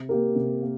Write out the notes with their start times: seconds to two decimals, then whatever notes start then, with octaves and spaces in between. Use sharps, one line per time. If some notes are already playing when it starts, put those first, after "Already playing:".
Already playing: C3
0.09 A#3 G4 A#4
0.36 C3
0.63 A#3